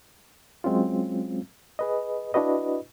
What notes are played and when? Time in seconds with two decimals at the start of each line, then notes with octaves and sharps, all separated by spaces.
0.64 F#3 G#3 C4 C#4 F4
1.79 G#4 B4 D#5
2.34 D4 E4 F#4 B4 D#5